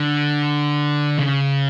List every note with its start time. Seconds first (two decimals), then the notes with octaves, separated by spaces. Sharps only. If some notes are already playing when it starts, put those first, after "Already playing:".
Already playing: D3
1.19 C#3